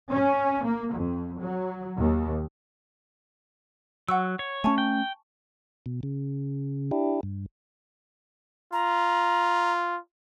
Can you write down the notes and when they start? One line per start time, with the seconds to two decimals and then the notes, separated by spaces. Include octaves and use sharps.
0.12 C#4
0.64 A#3
0.95 F2
1.41 F#3
1.98 D#2
4.09 F#3 F#5 C#6 E6
4.39 C#5
4.64 A3 C#4 G#5 A5 C#6
4.78 G5
5.86 B2
6.03 C#3
6.91 D4 E4 G4
7.23 G2
8.73 F4 A#5